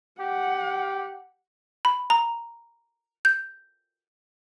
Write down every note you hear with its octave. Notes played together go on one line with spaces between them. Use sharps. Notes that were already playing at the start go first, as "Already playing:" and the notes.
G4 F#5
B5
A#5
G6